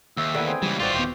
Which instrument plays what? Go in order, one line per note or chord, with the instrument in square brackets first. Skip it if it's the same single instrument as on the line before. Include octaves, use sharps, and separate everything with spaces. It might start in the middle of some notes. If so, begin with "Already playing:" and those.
[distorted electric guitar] D#2 [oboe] E5
[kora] D3 B3 E4
[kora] C4 [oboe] G#4
[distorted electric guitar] C#2 E3 [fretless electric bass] G3
[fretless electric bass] G#1 [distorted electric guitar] D#3 F4 [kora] C4 F#4 C5 [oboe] D5
[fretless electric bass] D#1 B3 [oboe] G4